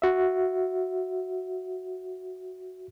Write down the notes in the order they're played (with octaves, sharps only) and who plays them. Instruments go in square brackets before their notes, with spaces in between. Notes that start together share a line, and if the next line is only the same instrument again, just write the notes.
[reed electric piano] F#4 E5